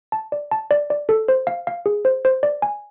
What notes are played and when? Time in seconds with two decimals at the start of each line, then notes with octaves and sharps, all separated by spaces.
0.12 A5
0.32 D5
0.51 A5
0.71 D5
0.90 D5
1.09 A4
1.28 C5
1.47 F5
1.67 F5
1.86 G#4
2.05 C5
2.25 C5
2.43 D5
2.62 G#5